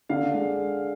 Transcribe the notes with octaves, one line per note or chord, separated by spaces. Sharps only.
D3 F5
G#3